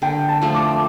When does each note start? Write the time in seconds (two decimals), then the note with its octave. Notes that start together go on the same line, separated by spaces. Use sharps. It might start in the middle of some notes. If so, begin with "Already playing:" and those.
0.02 D3 G5
0.28 A5
0.42 F3 A3
0.55 D6